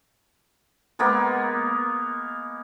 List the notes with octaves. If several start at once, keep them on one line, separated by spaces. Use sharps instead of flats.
G#3 A#3 B3